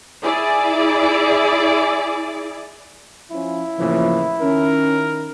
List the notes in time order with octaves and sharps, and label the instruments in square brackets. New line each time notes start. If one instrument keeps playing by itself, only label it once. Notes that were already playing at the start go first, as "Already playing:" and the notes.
[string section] E4 G#4 D5
[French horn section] F3 C#4 [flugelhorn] E4
[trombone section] A2 C#3 E3 [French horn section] F3 A#3
[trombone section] D#3 A#4 [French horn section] C#4